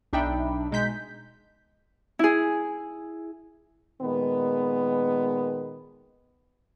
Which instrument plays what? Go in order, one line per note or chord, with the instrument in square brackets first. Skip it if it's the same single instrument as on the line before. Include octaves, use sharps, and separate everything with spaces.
[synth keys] B1 D4 D#4 E5 G5 B5
B2 G#3 D#4 G6 B6
[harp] E4 G#4
[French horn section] A#2 D#3 G#3 B3